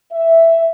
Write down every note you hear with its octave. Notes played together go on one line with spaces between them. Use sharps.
E5